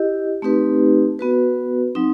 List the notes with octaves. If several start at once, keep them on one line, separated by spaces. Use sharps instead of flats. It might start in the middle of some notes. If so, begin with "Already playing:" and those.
Already playing: E4 G4 D#5
A3 C4 D#4 G4 B4
B3 F#4 B4
F#3 C4 D#4